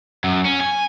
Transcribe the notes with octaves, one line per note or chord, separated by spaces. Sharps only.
F#2
C#4
G#5